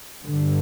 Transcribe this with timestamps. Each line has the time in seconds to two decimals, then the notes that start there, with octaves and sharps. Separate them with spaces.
0.25 G2 D3